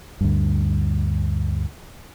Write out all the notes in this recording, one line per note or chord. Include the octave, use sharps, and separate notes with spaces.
D2 G2